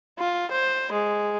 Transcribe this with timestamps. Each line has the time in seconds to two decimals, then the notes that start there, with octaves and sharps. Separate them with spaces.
0.19 F4
0.52 C5
0.93 G#3